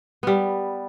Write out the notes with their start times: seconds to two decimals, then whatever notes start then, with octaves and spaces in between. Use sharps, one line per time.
0.23 G3 B3